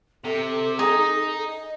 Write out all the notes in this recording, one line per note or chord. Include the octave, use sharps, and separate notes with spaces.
C3 A4
G#4 D#5 A#5
D#5